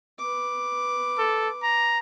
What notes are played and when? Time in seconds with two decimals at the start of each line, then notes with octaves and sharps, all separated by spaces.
0.18 B4 D6
1.19 A4
1.63 A#5